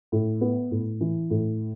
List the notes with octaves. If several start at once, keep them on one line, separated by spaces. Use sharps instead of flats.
A2
B3
A2
E3
A2